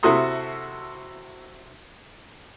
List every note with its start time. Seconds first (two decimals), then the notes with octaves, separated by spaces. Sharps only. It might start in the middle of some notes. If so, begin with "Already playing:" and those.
0.03 C3 E4 F#4 A4 C6 D#6